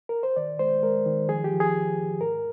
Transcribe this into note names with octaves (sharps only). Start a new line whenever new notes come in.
A#4
C5
D#3 D5
G#3 C5
G#3 A#4
D#3
F3 G#4
G4
F3
G#4
D2
D2
G#2 A#4